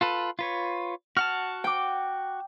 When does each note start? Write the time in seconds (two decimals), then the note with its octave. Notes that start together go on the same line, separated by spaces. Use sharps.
0.01 F4 A4 B4
0.39 F4 B4 C#5
1.17 F#4 F#5 A5 F6
1.64 G5 D6